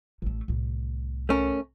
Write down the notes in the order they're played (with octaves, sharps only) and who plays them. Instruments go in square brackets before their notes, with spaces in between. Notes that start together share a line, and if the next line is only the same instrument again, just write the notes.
[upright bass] A1 A3
C2 A2
[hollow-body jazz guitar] A3 C#4 A#4